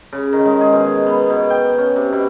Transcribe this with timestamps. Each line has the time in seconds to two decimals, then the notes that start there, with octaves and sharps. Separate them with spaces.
0.13 C#3
0.33 D#3
0.45 G#3
0.61 G#4
0.73 B2
1.06 B3
1.30 B2
1.50 G5
1.78 C#4
1.96 C3
2.13 B2